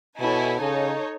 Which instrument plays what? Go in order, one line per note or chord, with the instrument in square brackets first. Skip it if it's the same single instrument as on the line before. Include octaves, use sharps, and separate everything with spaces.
[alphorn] B2 [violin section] E4 A4 C#5 G#5
[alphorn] C#3 [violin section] D#4 A4 C#5